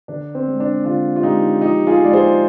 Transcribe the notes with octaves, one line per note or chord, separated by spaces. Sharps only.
D3 D4
C4
G#3
D4
D3 D4 F4
F4
G#3 D#4 G4
F3 D#4 G4
F4 G#4
G#3 D5
G#4 C5